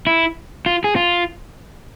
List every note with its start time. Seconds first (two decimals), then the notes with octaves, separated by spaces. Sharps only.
0.07 E4
0.66 F4
0.84 G#4
0.96 F4